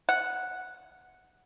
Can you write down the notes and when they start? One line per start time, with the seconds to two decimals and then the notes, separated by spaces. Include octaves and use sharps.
0.09 F#5